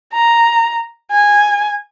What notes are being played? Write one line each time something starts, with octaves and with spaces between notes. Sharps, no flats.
A#5
G#5